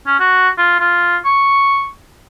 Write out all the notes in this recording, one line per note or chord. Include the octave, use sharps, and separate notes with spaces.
C#4
F#4
F4
F4
C#6